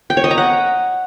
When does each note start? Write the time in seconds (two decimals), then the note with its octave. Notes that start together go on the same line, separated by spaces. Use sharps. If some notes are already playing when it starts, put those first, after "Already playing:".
0.10 G5
0.17 C#5
0.24 D#5
0.31 A#5
0.38 F#5